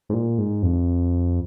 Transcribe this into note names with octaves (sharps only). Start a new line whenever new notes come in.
G#2
A#2
G#2
F2